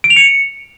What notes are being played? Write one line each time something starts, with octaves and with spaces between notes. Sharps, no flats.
D7
F7
C#7